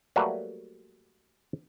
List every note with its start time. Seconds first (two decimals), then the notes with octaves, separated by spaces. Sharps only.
0.16 F#3 G3 A3 A#3 B4